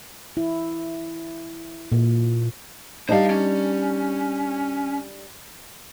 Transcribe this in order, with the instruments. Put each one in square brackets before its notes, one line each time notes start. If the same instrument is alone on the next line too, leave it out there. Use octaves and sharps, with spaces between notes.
[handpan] E4
A#2
[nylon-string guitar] G3 D4 D#4 [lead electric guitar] C5 F5
[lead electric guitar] C#4